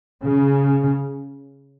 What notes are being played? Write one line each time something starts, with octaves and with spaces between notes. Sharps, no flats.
C#3